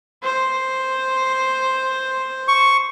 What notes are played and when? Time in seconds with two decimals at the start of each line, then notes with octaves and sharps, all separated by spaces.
0.23 C5
2.48 C#6